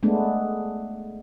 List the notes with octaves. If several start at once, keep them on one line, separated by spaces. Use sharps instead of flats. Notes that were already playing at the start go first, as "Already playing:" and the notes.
G#3 A3 B3 D4